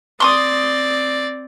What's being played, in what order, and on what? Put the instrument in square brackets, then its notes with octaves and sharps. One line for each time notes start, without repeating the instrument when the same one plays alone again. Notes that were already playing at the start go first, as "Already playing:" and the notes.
[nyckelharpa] C4 D5 [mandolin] C6 C#6 D#6